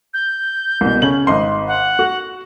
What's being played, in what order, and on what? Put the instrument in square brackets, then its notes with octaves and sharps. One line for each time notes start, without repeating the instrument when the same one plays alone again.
[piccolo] G6
[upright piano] C2 B2
C#3 C#4 F#7
G#1 D#5 C6
[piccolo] F#5
[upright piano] F#4